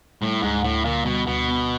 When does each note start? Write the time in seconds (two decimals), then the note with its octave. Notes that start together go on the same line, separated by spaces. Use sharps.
0.22 A2 G3
0.42 D2 G#2
0.63 D2 A2
0.84 A#2 D3
1.05 B2 G3
1.26 D2 B2
1.48 B3